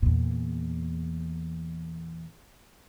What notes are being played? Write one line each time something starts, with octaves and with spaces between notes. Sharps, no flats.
E2 A#2